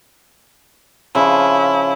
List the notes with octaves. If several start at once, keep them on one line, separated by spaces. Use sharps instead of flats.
C#3 F3 E4